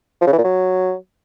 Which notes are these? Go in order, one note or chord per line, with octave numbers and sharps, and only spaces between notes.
F3
C#3
E3
A#2
F#3